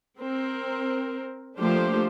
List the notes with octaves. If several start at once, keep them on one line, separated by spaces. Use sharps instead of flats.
C4 A#4
F3 A3 A#3 D4 G4 C5